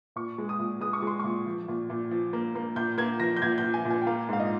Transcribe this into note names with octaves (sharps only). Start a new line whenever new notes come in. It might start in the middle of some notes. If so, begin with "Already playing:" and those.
A#2 C#6
G#3
D#6
A#2
G#3 D#6
C#6
G#3 C6
A#2 C#6
F3
A#2
A#2
F3
A#3
A#3
A#2 G6
A#3 G#6
F3 A#6
G6
A#2 G#6
G6
F3
G#5
A#2
G#5
G5
A#3 F5
G#2 F5
D#5